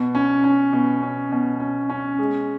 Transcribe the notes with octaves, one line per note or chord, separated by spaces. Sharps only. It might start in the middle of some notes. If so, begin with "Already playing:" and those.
Already playing: B2
C#4
C#4
B2
C#4
B2
C#4
C#4
G#3